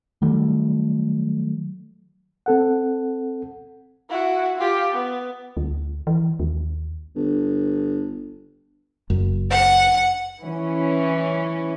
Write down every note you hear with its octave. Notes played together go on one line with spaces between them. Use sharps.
D#3 F#3 G3 A3
C4 A4 F#5
E4 F#4
F4 G4
B3
D2
E3
D#2
G1
F#1 F#2
F#5
E3 C#4